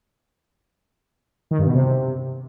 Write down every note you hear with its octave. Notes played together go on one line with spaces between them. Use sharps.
D#3
G2
B2
C3